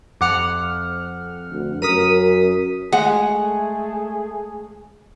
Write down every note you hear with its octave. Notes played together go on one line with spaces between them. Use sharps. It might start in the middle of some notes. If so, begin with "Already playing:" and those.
F2 F#5 D6 F6 C#7
D2
F#2 A#4 D#6 B6 D#7
G#3 A3 G#4 F#5